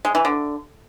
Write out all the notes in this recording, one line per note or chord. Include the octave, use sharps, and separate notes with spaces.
G#3
E3
D3